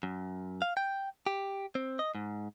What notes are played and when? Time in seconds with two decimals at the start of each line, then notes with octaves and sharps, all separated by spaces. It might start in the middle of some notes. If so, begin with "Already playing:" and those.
0.03 F#2
0.62 F5
0.77 G5
1.27 G4
1.75 C4
1.99 D#5
2.15 G#2